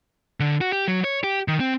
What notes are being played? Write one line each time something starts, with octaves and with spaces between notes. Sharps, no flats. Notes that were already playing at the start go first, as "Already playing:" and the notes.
D3
F#4
G4
F#3
C#5
G4
D#3
C4